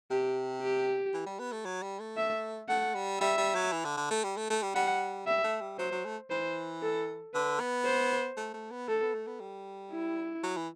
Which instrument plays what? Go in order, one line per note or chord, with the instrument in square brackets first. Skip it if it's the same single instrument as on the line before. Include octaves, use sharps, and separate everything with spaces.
[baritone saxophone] C3 [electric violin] G4
[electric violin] G4
[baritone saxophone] E3
G3
B3
A3
F#3
G3
A3
[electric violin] E5
[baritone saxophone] A3 [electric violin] F#5
[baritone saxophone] G3
[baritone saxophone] G3 [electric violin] E5
[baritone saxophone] G3
F#3
E3
D3
D3
A3
G3
A3
A3
G3
[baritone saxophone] G3 [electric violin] F#5
[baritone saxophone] G3 [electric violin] E5
[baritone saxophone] A3
G3
[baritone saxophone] F#3 [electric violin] C5
[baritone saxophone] F#3
A3
[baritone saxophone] E3 [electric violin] C5
[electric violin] A4
[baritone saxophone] D3 [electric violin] B4
[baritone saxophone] B3
[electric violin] C5
[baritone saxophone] A3
A3
B3
[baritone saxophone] A3 [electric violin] A4
[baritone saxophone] B3
A3
B3
G3
[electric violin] E4
[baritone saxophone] F#3
E3